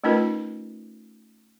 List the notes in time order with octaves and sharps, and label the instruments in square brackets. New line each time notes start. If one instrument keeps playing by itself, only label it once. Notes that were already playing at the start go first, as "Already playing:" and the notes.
[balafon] A3 C#4 D#4 F4 A#4 B4